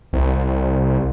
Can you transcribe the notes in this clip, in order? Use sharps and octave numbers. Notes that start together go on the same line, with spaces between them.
C2